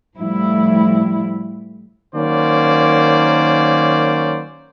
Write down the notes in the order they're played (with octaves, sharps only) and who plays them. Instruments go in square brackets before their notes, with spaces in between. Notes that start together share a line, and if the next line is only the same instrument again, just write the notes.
[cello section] A2 F3 G3 E4
[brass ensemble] D#3 F#3 A#3 C#4 C5 D5